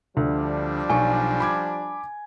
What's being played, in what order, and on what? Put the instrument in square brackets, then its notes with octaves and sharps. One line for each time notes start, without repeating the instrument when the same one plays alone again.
[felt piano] D2 [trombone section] F3 G3 D4
[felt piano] B1 C#6 [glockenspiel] G#5
[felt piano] B5 D6 G#6